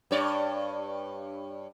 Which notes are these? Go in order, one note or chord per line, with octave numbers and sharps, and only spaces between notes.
G2 C#5 D5